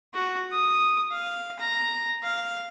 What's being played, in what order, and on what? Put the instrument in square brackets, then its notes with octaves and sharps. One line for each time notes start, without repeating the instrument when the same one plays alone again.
[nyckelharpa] F#4
D#6
F5
A#5
F5